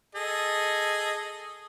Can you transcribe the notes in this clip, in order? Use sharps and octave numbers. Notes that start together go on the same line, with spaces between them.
G#4 A4 D#5